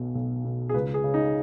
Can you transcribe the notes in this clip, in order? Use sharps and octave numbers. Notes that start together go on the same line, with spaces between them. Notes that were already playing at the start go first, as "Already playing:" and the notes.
Already playing: B1 B2
B1
B2
G#4
C#2 B4
G#4
C#3
D#4